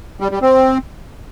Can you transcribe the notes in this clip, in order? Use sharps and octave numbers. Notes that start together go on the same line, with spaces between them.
G3
G3
C4